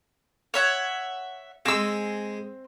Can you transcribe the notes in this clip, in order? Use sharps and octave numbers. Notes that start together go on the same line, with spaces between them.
C#5 E5 F#5
G#3 C4 G#4 E6